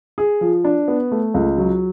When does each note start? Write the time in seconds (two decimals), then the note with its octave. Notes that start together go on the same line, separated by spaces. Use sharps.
0.18 G#4
0.41 F3
0.65 D4
0.88 B3
1.12 A3
1.34 C#2
1.58 F#3